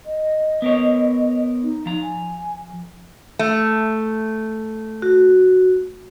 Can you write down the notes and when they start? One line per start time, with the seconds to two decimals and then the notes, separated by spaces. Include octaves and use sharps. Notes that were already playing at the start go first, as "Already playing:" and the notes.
0.06 D#5
0.62 B3 A#4 C#5
1.62 D#4
1.86 F3 A#5
2.02 G#5
3.39 A3
5.02 F#4